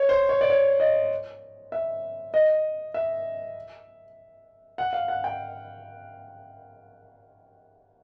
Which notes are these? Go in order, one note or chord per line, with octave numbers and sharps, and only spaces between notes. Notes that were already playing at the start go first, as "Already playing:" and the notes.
Already playing: C#5
C5
C#5
D5
C#5
D#5
E5
D#5
E5
F#5
F5
F#5
G5